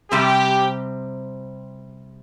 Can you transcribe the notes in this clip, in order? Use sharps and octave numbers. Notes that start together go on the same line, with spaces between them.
C3 G3 C4 G4